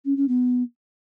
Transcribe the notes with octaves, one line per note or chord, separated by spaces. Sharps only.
C#4
C#4
B3